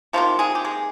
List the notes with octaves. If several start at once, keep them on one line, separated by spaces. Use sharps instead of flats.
C3 D#3 F3 A#3 F4
G#3 G#4
G4
G#3 G#4